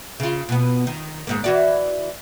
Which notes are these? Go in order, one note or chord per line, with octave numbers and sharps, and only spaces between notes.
C#3 F4
B2 B3
D#3
D#2 G#2 A#3
E3 F#4 D5